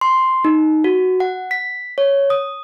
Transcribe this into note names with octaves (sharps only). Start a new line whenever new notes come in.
C6
D#4
F#4
F#5
B6
C#5
D#6